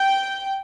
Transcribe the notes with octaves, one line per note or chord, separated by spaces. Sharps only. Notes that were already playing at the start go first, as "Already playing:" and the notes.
Already playing: G5